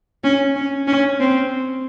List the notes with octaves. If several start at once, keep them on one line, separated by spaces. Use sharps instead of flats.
C#4
C#4
C#4
C4